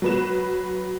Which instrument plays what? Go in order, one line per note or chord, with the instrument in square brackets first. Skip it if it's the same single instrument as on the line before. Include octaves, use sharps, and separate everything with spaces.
[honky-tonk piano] F#3 B4 E7